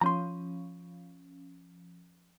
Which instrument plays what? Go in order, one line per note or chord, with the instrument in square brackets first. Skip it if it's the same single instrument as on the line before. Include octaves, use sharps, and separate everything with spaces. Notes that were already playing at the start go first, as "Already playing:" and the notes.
[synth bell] F3 C#4 [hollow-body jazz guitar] A#5 C6